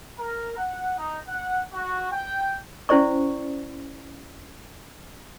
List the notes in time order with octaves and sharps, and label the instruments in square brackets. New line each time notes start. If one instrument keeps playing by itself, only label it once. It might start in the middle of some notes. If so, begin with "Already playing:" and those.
[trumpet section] A#4
F#5
D#4
F#5
F#4
G5
[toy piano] C#4 E4 C5 D5 C#6